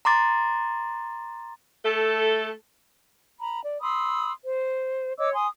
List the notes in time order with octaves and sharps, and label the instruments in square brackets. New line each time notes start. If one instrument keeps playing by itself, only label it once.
[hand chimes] A#5 C6 D6 A6
[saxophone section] A3 A4
[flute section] A#5 B5
D5
B5 C6 D#6 E6
C5
C#5 D#5 D6 E6
G#5 C6 D#6